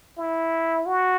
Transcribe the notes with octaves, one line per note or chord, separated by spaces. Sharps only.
E4
F#4